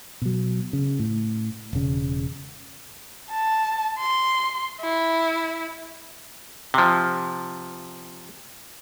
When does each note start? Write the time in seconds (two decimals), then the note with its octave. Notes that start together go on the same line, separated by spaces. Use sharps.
0.22 B2 F#3
0.73 C#3
0.99 A2
1.73 E1 C#3
3.31 A5
3.99 C6
4.82 E4
6.74 C3 F3